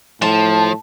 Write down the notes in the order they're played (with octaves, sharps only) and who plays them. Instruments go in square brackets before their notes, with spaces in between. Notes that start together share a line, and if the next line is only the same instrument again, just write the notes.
[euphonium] A2 [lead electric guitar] F3 [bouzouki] A5